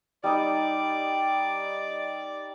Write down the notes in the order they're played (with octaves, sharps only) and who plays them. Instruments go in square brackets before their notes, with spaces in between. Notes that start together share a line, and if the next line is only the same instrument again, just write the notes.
[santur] G3 D#4 D#5 [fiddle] D5